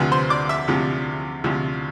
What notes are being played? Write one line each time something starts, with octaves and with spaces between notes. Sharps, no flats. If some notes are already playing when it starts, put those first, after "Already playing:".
Already playing: D2 C3 F3 B4 B5
C5 C6
D5 D6
E5 E6
D2 C3 F3
D2 C3 F3